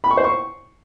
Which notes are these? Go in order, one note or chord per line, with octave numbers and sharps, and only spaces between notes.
B5
C#6
C5
C#6